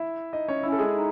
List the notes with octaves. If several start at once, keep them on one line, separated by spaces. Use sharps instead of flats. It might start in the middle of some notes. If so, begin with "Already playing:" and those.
Already playing: E4 E5
D#4 D#5
C#4 C#5
C#4 E4 E5
A4
G#3 G#4
D#4